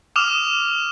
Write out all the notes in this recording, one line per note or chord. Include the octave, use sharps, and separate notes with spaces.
D6 D#6 F6 E7 F7